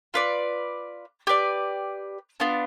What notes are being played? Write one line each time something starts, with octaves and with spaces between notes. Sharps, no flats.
F4 B4 D5
G4 B4 D5
B3 D4 F4